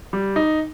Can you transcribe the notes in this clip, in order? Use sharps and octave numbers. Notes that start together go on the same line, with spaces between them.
G3
D#4